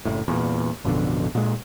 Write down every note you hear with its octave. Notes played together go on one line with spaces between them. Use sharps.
F#1 A2
E2 A#2
A1 F2 B2 D3
A#2 G#3